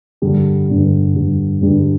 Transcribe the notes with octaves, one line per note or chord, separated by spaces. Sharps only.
G2 D3 G3 D4
G2 D3 G3 D4
G2 D3 G3 D4
G2 D3 G3 D4